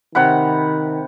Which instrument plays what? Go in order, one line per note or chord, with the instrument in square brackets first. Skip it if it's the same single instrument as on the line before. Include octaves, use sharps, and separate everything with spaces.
[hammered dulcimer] C3 F#5 B5 [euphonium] D#3